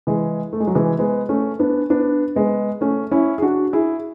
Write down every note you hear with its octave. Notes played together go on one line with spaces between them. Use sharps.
E3 G#3
A3
G#3
F#3
E3 G#3
G#3 B3
A3 C#4
B3 D4
B3 D4
G#3 B3
A3 C#4
C#4 E4
G#4
D4 F#4
E4 G#4